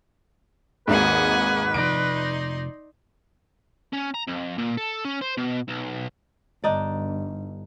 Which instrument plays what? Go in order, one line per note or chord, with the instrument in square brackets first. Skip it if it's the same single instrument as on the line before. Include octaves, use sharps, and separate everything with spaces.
[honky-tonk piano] G#1 G#2 [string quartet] D#2 F#5 G#5 [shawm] B4
[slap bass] F1 F3 [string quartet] D#4 D5 C6 [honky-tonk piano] D7
[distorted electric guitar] C#4
A#5
F2
A#2
A4
C#4
C5
B2
B1
[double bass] G1 [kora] D4 D#4 D5